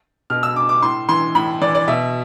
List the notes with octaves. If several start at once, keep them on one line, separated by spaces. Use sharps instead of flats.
B2 F6
E6
D6
D6
A2 C6
E3 C6
A2 B5
E3 D5
D5
B2 E5